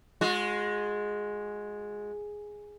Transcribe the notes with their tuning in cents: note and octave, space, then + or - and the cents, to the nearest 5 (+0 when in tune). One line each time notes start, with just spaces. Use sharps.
G#3 +0 F#4 -40